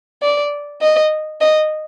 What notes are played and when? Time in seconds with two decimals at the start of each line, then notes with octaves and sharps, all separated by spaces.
0.23 D5
0.81 D#5
1.41 D#5